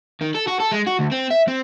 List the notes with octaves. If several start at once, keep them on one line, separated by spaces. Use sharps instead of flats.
D#3
A4
F#4
A4
G#3
F#4
D2
C4
E5
C4